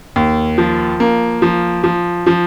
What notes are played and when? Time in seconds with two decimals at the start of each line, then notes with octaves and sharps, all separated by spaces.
0.16 D#2
0.58 F3
1.00 A#3
1.42 F3
1.84 F3
2.27 F3